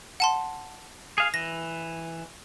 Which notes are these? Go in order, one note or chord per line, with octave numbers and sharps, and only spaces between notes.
F#5 A5 C6
G#4 F5
E3 A#6